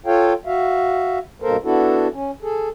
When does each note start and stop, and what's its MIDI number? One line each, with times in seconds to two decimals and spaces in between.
0.06 0.33 65
0.06 0.33 69
0.06 0.33 73
0.06 0.33 77
0.06 0.33 79
0.46 1.19 66
0.46 1.19 76
0.46 1.19 77
1.42 1.57 43
1.42 1.57 47
1.42 1.57 58
1.42 1.57 69
1.42 1.57 70
1.42 1.57 72
1.64 2.08 59
1.64 2.08 62
1.64 2.08 64
1.64 2.08 66
1.64 2.08 69
2.13 2.31 61
2.43 2.69 68
2.43 2.69 69